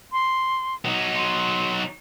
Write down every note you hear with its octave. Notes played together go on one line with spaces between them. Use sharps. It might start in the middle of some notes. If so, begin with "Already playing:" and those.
C6
F#3 D#4
C6